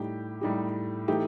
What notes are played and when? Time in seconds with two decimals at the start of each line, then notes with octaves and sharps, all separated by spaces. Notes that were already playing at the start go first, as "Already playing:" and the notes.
Already playing: A2 G3 D#4 G4
0.41 A2 G3 D#4 G4
1.08 A2 E3 A3 D#4 G4